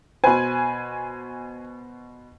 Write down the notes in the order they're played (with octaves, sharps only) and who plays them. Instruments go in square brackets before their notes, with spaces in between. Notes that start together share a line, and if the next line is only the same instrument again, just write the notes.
[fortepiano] B2 B4 C5 [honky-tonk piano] G#5